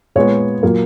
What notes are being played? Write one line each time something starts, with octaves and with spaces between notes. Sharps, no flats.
A#2 G#3 B3 C#5
A#2 F#3 A#3